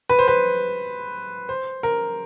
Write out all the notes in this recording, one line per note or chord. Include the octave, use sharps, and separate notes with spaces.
B4
C5
B4
C5
A#4